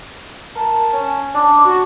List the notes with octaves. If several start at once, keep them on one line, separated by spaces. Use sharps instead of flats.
A#4 A5
C#4
D4 D6
F#4